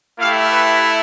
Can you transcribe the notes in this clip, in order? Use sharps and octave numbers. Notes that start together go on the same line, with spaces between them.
A3 E4 G4 F5
B4